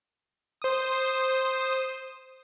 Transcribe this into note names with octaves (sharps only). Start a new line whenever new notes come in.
C5 D#6